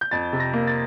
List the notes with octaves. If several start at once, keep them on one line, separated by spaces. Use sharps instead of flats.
G6
F2 A6
C3
A#6
A#3
A6